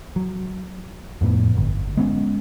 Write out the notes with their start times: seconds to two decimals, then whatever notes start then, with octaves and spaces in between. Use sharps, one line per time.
0.16 F#3
1.21 F2 A2 A#3 B3
1.57 G1
1.97 G#3 B3 C#4